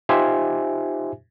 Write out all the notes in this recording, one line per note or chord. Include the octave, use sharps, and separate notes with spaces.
D#4 F4 G4 C5 E5 G#5